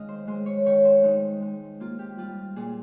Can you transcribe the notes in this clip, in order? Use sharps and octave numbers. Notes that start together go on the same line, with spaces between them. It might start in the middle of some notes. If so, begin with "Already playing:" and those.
Already playing: D#3 G#3 D#5 F5
C5
G#3 C5
C#5
D#3 C#5
C5
G#3 D#4
G#3
A#3 F4
G4
G3 F4
A#2 G#4